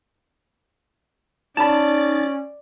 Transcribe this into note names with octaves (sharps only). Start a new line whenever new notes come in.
C#4 D#4 D5 A5 B5 A6